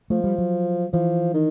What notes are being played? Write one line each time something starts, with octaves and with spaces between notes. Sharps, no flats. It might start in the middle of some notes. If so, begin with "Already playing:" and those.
F3 A3
G3
F#3
E3 F3
D#3